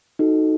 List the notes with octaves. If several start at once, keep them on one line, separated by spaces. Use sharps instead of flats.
D#4 F#4 A4